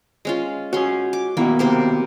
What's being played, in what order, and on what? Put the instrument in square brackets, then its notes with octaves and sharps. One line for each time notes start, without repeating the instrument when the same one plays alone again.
[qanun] G#3 C#4 F4
[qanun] C#4 C6 [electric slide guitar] F#4 G#5
[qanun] D6
[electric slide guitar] D#3 B3 F#4 [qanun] A#3 E4
[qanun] C3 A#3 C5